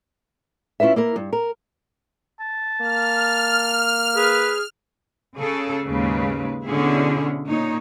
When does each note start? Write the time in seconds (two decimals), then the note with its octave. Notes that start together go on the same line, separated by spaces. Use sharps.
0.80 C#4 E4 F4 B4 E5
0.96 A#3 E4 A#4
1.16 G2
1.33 A#4
2.40 A5
2.81 A#3 F6
4.16 G#4 B4
5.37 C#3 G#4 A4
5.86 D#2 G#2 C#3 G#3 B4
6.66 B2 D3 C#4 E4 G#4
7.47 A#2 D#4 C#5